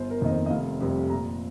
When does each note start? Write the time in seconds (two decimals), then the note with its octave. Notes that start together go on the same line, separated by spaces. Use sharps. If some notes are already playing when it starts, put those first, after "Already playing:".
Already playing: G1 C5
0.10 A#4
0.21 F2 D#3 A#3 D#5
0.30 C5
0.46 D#5
0.50 F1 F5
0.80 F2 C3 G3
1.10 A#2 A#5